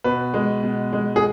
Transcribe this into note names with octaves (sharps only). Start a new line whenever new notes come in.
B2 B4
G#3
B2
G#3
G#4